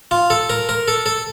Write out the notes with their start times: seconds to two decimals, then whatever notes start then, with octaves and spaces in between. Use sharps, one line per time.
0.11 F4
0.30 A4
0.50 A#4
0.69 A#4
0.88 A4
1.06 A4